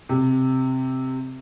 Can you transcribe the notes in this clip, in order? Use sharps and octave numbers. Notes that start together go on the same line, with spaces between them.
C3